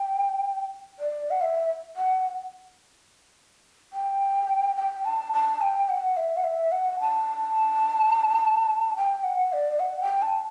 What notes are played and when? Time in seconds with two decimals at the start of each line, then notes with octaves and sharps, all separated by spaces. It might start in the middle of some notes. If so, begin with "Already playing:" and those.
Already playing: G5
0.99 D5
1.31 F#5
1.41 E5
1.96 F#5
3.93 G5
4.76 G5
5.05 A5
5.33 A5
5.61 G5
5.89 F#5
6.17 E5
6.37 F#5
6.44 E5
6.72 F#5
7.00 A5
8.97 G5
9.24 F#5
9.53 D5
9.80 F#5
10.01 G5
10.22 A5